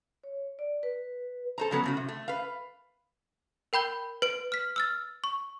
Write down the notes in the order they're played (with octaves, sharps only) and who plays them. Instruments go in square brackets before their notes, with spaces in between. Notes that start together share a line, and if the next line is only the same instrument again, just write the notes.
[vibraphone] C#5
D5
B4
[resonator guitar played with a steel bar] A4 C5 A#5
C#3 F#3 B3
A2 C#3 F#4
C3
A3
B4 F5
[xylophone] A#4 G5 B5 G6 G7
B4 D7
F6 B6
E6 F6 A6
C#6